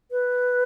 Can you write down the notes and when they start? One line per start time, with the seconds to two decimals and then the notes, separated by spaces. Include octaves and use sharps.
0.11 B4